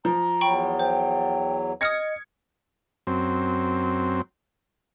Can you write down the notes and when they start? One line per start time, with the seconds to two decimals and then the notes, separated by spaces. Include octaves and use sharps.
0.05 F3 A#5
0.41 E2 F#3 G5 B5 C#6
0.79 C5 G5
1.81 D#5 D#6 F6 G#6 A#6 C#7
3.07 F#2 C4